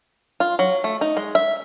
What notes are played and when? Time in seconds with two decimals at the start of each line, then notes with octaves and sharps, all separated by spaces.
0.40 F4
0.59 F#3
0.84 A3
1.01 D#4
1.17 G#3
1.35 E5